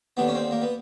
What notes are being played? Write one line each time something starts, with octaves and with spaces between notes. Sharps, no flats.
D#2 D3 B3
C#4
C4
A#3
B3